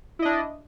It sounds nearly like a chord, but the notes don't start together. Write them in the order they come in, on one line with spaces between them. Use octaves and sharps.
E4 D#5 D4